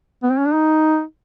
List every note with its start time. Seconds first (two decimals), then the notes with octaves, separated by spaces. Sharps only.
0.23 B3
0.31 C4
0.38 C#4
0.46 D4
0.53 D#4